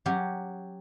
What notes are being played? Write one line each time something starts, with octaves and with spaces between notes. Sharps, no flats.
F#3 C#4 F#4 G4